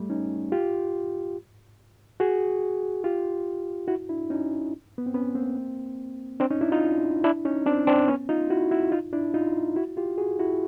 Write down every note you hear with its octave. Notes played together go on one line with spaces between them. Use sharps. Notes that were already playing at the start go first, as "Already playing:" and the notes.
Already playing: G3 A3
C#4 D#4
F4 G4
F#4 G#4
F4 G4
E4 F#4
D4 E4
C#4 D#4
B3
C4
B3 C#4
A#3 C4
C4 D4
C#4 D#4
D4 E4
D#4 F4
D4 E4
C#4 D#4
C4 D4
C4 D4
B3 C#4
D#4 F4
E4 F#4
E4 F#4
D#4 F4
D4 E4
D#4 F4
E4 F#4
F4 G4
F#4 G#4
E4 F#4